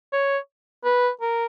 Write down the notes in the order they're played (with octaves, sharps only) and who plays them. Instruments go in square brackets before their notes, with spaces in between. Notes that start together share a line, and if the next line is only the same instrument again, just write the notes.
[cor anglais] C#5
B4
A#4